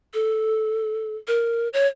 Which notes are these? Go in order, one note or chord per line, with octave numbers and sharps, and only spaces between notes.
A4
A#4
C#5